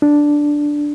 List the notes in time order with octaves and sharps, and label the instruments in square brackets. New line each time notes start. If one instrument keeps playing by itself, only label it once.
[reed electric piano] D4